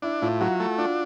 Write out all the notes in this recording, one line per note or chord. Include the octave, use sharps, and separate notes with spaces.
D4 E4
A2 F4
F#3 F#4
A3
D4 F4